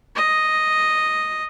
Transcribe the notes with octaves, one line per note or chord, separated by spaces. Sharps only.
D#5